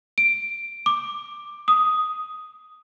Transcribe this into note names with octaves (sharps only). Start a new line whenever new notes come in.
D7
D6
D#6